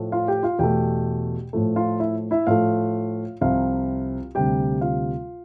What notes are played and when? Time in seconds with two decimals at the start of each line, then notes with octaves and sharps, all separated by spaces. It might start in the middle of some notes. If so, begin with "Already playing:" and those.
Already playing: A2 F3 A3
0.12 F4 F5
0.28 G4 G5
0.43 F4 F5
0.59 E2 B2 A3 G4 G5
1.53 A2 F3 A3
1.76 F4 F5
2.00 E4 E5
2.31 E4 E5
2.47 A2 F3 A3 F4 F5
3.41 C2 C3 F3 F4 F5
4.35 D2 C3 G3 G4 G5
4.81 F4 F5